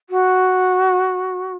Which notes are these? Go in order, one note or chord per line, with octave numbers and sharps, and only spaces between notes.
F#4